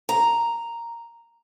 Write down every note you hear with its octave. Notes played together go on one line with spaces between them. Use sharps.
A#5